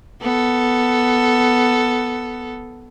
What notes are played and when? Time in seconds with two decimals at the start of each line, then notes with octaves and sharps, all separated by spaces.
0.21 B3 A4